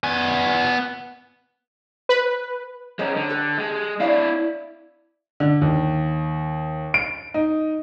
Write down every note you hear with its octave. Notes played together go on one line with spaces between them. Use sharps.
B3 G#5
B4
G#3 C#4 C5 D#5 A#5
D3
G4 A4 B4
G#3
D4 E4 C#5 D5 F5
D3
D#2
D7
D#4